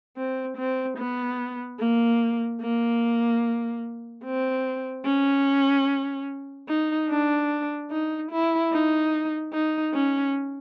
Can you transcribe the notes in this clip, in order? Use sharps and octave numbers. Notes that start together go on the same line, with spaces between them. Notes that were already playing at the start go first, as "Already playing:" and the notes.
C4
C4
B3
A#3
A#3
C4
C#4
D#4
D4
D#4
E4
D#4
D#4
C#4